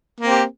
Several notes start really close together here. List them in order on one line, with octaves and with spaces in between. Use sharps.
A#3 C4 G4